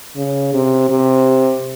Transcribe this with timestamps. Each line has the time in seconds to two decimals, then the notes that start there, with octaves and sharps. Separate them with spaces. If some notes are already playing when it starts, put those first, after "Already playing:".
0.16 C#3
0.54 C3
0.90 C3